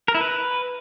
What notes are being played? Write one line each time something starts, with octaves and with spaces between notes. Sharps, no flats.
A#4
E4
B4